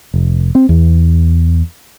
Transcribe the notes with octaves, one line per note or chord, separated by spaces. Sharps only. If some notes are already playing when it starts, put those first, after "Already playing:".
F1
C4
E2